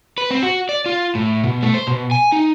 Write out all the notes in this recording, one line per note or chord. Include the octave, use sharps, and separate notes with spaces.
B4
C4
F#4
D5
F4
A2
B2
A3
C5
B2
G#5
D#4